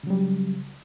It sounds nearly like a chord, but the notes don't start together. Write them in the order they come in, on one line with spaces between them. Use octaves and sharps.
C#3 F#3 G3